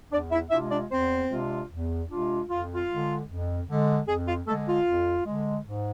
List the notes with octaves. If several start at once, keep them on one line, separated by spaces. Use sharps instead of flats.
E2 D4 D5
E4 E5
C3 G#3 D4 E4 F4 E5
D4 D5
E2 C4 C5
C3 G#3 D4 F4
E2
C3 G#3 D4 F4
F2 F4
F4
D3 G#3
F2
D3 G#3
F2 G#4
F4
D3 G#3 A3 A4
F4
F2
D3 G#3
G#2